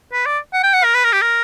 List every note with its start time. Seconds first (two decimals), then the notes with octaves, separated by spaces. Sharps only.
0.12 B4
0.26 D5
0.53 F#5
0.63 G5
0.73 F#5
0.84 A#4
0.94 B4
1.04 A#4
1.12 G4
1.22 A#4